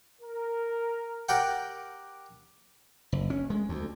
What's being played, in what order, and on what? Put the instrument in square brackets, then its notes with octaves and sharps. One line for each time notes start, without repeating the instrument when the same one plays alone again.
[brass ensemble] A#4
[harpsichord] G4 A#4 D5 F#5 G5
[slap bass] F#1
C#4
G#3
D2